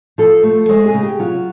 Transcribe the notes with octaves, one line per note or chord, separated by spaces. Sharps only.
F3 A4
A3
G#3 C5
G#4
C#3
G4
F#3 F4